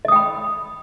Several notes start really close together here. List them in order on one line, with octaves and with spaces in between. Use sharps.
D#5 D#6 G5 B5